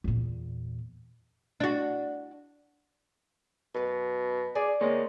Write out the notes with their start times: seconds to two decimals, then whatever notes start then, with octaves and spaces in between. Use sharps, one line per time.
0.04 E2 A#2
1.60 D4 F#4
3.74 F#2 B2 B4
4.55 G#4 D5
4.81 G#3 A#3 C#5